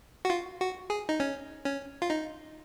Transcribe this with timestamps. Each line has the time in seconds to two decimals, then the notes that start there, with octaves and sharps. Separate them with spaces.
0.25 F#4
0.30 F4
0.60 F#4
0.90 G#4
1.09 D#4
1.20 C#4
1.65 C#4
2.02 F4
2.10 D#4